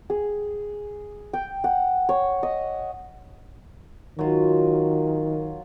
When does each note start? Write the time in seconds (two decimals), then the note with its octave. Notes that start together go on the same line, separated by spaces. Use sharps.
0.10 G#4
1.33 G5
1.64 F#5
2.09 C#5
2.43 D#5
4.19 D#3 F#3 F4